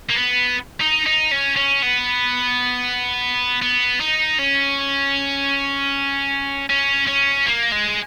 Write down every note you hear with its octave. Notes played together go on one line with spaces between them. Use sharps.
A#3
B3
D#4
D#4
C#4
C#4
B3
B3
D#4
C#4
C#4
C#4
A#3
G#3